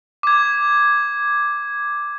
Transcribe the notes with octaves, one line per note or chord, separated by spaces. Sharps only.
D6 G#6